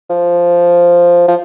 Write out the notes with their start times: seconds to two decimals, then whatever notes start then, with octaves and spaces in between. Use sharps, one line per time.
0.10 F3
1.28 F3